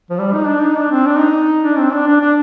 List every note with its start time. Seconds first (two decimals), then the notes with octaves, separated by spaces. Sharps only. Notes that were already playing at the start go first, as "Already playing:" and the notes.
0.10 F3
0.19 G3
0.33 D#4
0.47 D4
0.62 D#4
0.76 D4
0.91 C4
1.06 D4
1.19 D#4
1.63 D4
1.78 C4
1.92 D4
2.07 D4
2.21 D4